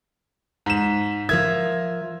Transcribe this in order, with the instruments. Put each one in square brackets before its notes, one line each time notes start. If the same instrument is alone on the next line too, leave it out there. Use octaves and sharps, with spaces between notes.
[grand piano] G#2 E7
[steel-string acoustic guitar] F3 A#4 E5 [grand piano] G#6